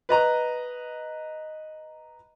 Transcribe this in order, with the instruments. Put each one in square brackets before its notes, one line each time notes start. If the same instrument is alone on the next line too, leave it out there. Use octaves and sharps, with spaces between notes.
[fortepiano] B4 D#5 A#5